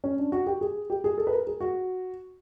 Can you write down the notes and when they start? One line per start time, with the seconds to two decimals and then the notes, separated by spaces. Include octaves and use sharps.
0.04 C#4
0.19 D4
0.32 F#4
0.47 G4
0.61 G#4
0.90 G4
1.04 G#4
1.18 A4
1.27 B4
1.33 A#4
1.47 G#4
1.60 F#4